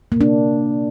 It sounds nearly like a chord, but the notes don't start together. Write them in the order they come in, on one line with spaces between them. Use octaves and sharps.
A#3 C3 D4